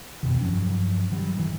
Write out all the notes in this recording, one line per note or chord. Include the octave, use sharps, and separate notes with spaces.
F2 B2 D#3
G2 F3 F#3 C#4
D#3 F#3 G3
G#2 D#3 E3